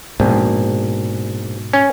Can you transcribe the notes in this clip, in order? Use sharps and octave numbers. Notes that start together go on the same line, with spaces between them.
A#1 G#2 B2
C#4